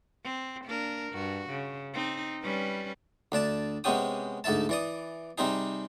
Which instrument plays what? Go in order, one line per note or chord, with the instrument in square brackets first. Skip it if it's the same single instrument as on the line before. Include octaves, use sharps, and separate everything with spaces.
[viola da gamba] C4
A#3 D4 A#4
G2 F#4
C#3
C4 D#4
G3 C#4 B4
[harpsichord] D2 D4 D5 A5
C3 G#3 B3 C#4 G4 D#6
D2 G#2 A4 E5 A5
E3 D5 D#6
C3 G3 C4 D#4 G#4